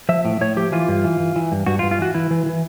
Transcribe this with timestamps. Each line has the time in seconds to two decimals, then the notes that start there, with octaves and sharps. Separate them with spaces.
0.09 F3 E5
0.25 A2
0.41 A2 C#5
0.56 F3 G4
0.72 E3 F4
0.88 G2
1.04 E3
1.20 E3
1.36 E3
1.52 G2
1.66 G2 F#4
1.79 F4
1.83 G2
1.91 F4
1.99 E3 F#4
2.14 E3 E4
2.31 E3
2.46 E3